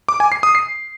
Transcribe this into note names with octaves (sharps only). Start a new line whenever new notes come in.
D6
G#5
C7
D#6
C7